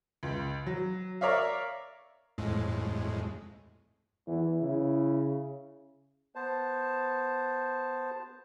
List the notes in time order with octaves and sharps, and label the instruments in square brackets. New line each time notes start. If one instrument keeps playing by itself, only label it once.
[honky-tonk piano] C#2
F#3
A#4 C#5 D5 E5 F5
[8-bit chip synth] F2 A2 G#3
[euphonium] E2 [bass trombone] E3
[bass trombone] C#3 [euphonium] E4
[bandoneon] B3 C5 A5